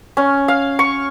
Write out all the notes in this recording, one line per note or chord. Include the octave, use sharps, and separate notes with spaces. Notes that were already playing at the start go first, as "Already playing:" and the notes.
C#4
F5
C#6